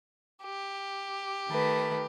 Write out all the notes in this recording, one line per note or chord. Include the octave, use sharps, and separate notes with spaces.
G4
D#3 A3 B4